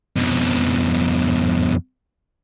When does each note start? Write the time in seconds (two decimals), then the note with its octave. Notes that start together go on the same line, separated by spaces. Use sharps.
0.16 F2 B2